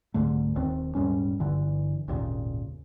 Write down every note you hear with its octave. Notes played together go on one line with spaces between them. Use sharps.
C2 G#2 D3 A3
D#1 D#2 C4
D#1 G#2 G3 C#4
G1 G2 D3 E3
G#1 D#2 A#2 C#3